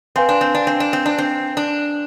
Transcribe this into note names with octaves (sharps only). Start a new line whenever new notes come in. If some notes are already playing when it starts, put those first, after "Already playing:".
C4 B4 F5 G#5 C6
D4
C4
D4
C4
D4
C4
D4
C4
D4